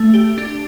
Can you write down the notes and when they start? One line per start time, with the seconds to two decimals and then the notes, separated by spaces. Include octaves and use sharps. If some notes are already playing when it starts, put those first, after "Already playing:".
Already playing: A3
0.14 G4
0.38 D4